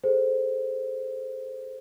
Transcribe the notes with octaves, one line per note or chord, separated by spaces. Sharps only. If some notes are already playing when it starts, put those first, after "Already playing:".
G#4 A4 C5